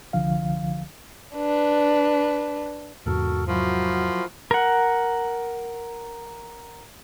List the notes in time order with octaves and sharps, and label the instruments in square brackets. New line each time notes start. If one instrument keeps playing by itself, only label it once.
[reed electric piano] C2 D3 F3 F5
[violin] D4 B4
[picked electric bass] E2 G#2 C3 [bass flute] F#4 [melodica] A4 A#4
[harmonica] F3 [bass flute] F#3 [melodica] E4 F#4 A#4
[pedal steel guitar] A#4 F#5